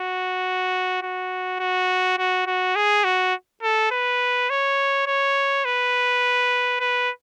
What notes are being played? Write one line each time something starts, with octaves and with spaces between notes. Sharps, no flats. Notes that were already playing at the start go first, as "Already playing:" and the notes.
Already playing: F#4
F#4
F#4
F#4
F#4
G#4
F#4
A4
B4
C#5
C#5
B4
B4